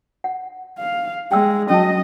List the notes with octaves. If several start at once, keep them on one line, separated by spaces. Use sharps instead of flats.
F#5
F5
G#3 G5 E6
F#3 C#4 D#5 G5 A5